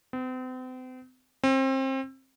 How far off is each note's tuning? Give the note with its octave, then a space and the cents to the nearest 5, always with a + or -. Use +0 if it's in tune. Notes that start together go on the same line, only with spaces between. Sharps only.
C4 -40
C4 +30